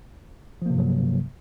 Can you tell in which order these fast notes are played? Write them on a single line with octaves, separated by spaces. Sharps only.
F3 A#3 C3 G2 F#3